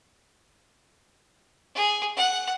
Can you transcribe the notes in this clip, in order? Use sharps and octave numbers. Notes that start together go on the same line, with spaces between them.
G#4
F#5